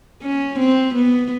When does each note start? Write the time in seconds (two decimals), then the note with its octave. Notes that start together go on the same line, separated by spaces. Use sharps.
0.22 C#4
0.59 C4
0.94 B3